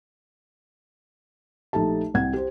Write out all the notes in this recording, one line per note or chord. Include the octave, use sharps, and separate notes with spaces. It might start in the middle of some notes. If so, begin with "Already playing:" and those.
A#1 A3 D#4 G4 A5
C2 C4 F#5 G#6
G4 C5